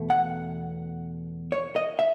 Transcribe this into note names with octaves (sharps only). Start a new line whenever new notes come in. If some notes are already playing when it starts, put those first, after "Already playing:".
Already playing: E2 B2 A3
F#5
C#5
D#5
E5